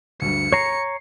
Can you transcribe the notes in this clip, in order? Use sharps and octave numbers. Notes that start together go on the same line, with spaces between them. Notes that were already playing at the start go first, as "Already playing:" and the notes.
D2 G2 C#7
C#5 A#5 C7